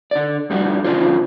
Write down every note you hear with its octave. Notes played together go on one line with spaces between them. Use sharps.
D3 D5
F2 G3 D4 F#4
E2 C#3 E3 D4 F4 C5